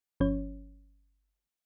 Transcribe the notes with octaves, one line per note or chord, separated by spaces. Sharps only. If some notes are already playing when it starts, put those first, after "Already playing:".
G1 F3 C#4 C#5